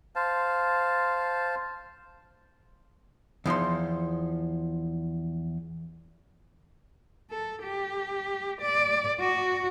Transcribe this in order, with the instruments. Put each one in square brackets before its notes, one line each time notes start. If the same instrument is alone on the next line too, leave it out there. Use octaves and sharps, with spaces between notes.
[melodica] C5 F5 A5
[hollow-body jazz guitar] E2 F3 D#4 C6
[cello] A4
G4
D5
F#4